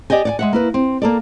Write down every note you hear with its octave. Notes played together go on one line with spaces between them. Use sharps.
G4 D5 D#5 G5 G#5
D5 F#5 G#5
G#3 E5 F#5
A#3 E4 B4
C4
A#3 A4 D5